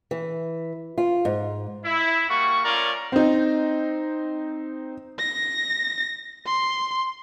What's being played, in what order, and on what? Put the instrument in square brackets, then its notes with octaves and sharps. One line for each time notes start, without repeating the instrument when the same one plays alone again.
[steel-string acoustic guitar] E3
F4
G#2
[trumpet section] E4
G3 A#3 F#4 C#6
A3 C#4 F4 A#4 D5
[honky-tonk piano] C4 D#4
[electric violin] A#6
C6